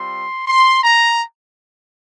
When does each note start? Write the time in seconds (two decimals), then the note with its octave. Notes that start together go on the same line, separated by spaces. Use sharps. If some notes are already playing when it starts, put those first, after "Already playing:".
Already playing: G3 C4 F4 C6
0.47 C6
0.83 A#5